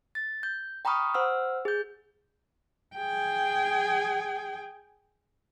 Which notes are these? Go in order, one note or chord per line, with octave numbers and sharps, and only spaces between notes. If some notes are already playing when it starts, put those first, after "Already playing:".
A6
G6
G5 A#5 B5 C#6 D#6 F6
C5 F#5 E6 F6
G#4 G6
G#4 G5